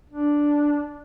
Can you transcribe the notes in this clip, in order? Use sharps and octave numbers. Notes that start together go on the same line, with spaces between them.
D4